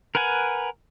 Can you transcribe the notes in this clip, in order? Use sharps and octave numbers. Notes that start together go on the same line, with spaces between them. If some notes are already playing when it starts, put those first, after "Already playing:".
A#4 B4 F#5 G#5